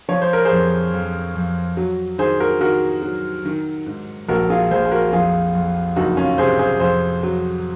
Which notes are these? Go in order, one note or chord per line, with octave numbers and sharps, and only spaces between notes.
F3 C#5
C5
A#4
G#4 C5
F2
F2
F2
F#3
D#3 G#4 C5
F#4 A#4
D#3 F#4 A#4
F#3
D#3
G#2
A#1 F#4 A#4
F4 G#4
A#1 G#4 C5
G#4
F#4 A#4
F2 F4 G#4
F2
F#1 D#4 F#4
C#4 F4
C3 G#4 C5
G#4 C5
F2 G#4 C5
F#3